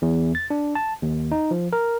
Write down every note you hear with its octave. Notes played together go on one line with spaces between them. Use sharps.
E2
A6
D4
A5
D#2
D#4
F3
A#4